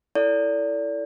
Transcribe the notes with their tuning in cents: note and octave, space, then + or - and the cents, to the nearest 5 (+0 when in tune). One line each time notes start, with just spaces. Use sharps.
E4 +0 A4 +10 D5 -30